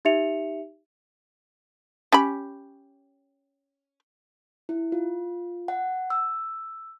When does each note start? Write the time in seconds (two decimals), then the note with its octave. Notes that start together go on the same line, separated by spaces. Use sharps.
0.05 D#4 G4 E5 C#7 F7
2.12 C#4 G4 B5
4.69 E4
4.92 F4
5.68 F#5
6.10 E6